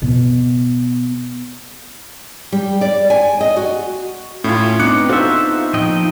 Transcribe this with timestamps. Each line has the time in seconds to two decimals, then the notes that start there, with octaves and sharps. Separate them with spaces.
0.02 B2 B3
2.52 G3
2.81 D5
3.10 G#5
3.41 D#5
3.56 F#4
4.44 A2 C#4 E4 F4
4.79 B3 C4 D4 D#4 D6 F#6 C#7
5.09 F4 F#4 A4 C5 E5
5.74 A#2 F3 D#5 G5